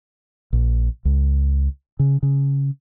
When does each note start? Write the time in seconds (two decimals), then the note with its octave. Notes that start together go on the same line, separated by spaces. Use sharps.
0.53 A#1
1.05 C#2
1.99 C#3
2.23 C#3